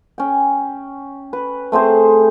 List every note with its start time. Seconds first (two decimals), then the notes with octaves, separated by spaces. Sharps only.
0.18 C#4 G5
1.33 B4
1.72 A3 C4 G#4 C5